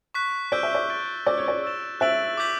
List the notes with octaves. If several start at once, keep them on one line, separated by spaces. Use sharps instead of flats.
C#6 F#6 B6
D5 E6 G6 D7 G7
E5
D5
A6 D7 G7
D5 E6 B6 F#7
C#5
D5
E6 A6 E7
E5 F#6 A6 D7 F#7
D6 G6 B6 F#7